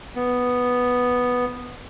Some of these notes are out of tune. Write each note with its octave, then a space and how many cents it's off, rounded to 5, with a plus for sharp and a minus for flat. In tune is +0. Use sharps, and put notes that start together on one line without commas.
B3 +0